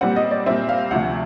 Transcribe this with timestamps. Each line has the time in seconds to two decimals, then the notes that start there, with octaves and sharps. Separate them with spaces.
0.01 A#2 G3 C4 F#5
0.16 D#5
0.31 D5
0.46 A#2 G3 C4 E5
0.69 F5
0.91 D2 C3 F3 A3 F#5